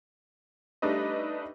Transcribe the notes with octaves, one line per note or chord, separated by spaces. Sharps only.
G3 A3 D4 D#4 B4 D#5